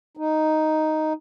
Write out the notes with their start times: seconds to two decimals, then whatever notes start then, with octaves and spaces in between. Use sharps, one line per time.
0.17 D#4